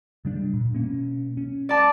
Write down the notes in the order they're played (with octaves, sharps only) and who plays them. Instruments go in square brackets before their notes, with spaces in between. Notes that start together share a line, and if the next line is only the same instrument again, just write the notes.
[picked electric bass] C#3 G3 D4
A#2
B2 A#3 C#4
C#4
[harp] D5 A5